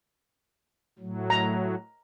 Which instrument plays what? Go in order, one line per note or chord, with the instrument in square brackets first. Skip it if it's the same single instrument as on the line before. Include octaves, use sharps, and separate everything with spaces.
[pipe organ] A2 F#3
[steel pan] A#5